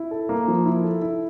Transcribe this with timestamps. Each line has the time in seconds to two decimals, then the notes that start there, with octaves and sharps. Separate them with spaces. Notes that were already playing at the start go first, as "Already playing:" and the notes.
Already playing: E4
0.11 A4
0.29 A#3
0.48 F3
0.65 E4
0.84 A4
1.02 E4